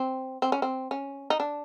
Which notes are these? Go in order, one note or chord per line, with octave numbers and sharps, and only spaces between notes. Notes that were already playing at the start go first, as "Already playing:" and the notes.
Already playing: C4
C4
C#4
C4
C#4
D#4
D4